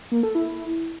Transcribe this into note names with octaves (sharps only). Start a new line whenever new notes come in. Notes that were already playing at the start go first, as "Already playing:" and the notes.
A#3
A4
E4